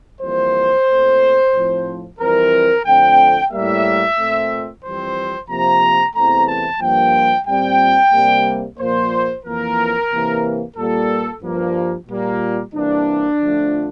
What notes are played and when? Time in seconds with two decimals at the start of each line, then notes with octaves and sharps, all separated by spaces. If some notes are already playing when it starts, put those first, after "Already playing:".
0.21 F2 E3 G3 A#3 C5
0.88 A#2 A3 C4
1.53 A2 F3 C4
2.19 F2 E3 G3 C4 A#4
2.85 F2 D3 A3 C4 G5
3.51 A2 G3 A#3 E5
4.17 A#2 A3 C4
4.82 F2 E3 G3 C4 C5
5.49 C3 F3 A#3 A#5
6.14 E2 C3 E3 A3 C4 A#5
6.47 A5
6.80 G2 F3 A#3 G5
7.46 A#2 G3 C4 G5
8.13 C3 G3 A#3
8.78 A#2 F3 A#3 C5
9.44 F2 E3 A#3 A#4
10.10 C3 E3 A#3
10.76 A#2 G3 A#3 A4
11.42 G2 F3 A#3
12.08 A#2 G3 A#3
12.73 C3 E3 G3 A#3 D4
13.39 F2 D3 F3 A3